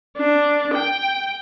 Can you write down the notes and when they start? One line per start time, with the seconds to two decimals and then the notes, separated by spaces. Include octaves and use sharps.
0.17 D4
0.74 G5